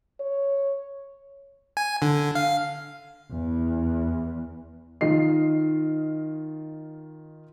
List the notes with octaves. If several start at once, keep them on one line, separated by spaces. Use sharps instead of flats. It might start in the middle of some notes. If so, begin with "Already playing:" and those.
C#5
G#5
D3
F5
E2
D#3 F4 D#5 C7